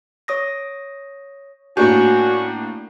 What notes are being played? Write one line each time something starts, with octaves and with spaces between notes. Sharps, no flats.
C#5 D#6 A#6
A2 A#3 C#4 D4 F#4 G6